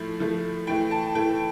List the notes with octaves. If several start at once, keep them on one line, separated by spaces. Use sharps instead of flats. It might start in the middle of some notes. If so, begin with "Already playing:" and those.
Already playing: A2 F3 A3
A2 F3 A3
A2 E3 A3 G5
A5
A2 E3 A3 G5